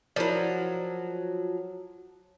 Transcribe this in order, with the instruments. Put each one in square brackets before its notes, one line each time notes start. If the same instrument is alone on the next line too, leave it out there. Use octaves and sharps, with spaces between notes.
[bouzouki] F3 F#3 [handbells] E4 A#4 D5